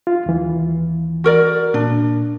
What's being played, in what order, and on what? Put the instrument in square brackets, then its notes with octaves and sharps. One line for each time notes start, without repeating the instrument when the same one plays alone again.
[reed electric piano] F4
D#2 E3
[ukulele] F#4 A#4 D5
[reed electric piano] A#2 [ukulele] D4